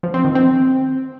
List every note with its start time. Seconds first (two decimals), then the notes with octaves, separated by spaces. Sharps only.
0.03 F3
0.14 C4
0.25 D#3
0.35 C4